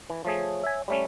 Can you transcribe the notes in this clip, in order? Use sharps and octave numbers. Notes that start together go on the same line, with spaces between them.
E3
F3 A3 G#4 C#5
E5 G#5
G3 A3 C#4 C#5